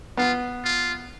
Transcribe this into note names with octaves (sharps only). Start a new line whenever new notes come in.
B3 F4
F4